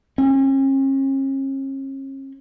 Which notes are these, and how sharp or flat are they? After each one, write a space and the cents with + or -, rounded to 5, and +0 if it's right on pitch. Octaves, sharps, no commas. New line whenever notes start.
C#4 -40